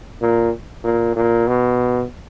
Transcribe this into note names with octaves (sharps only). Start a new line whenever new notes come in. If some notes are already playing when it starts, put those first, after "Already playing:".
A#2
A#2
A#2
B2